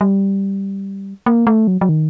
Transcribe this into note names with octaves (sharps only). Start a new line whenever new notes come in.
G3
A#3
A3
F#3
F#3
D#3